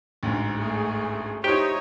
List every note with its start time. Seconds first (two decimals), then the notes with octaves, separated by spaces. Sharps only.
0.23 A1 D2 G#2
0.56 A3 G#4
1.44 D#4 E4 G4 C5 C#5 G5